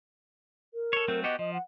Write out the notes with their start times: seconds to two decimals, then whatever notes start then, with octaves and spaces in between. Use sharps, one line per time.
0.74 A#4
0.93 A4 C#5
1.08 F#3 A3 C4
1.24 B3 F#4 G4 D#5
1.39 F3 D#5
1.53 F#5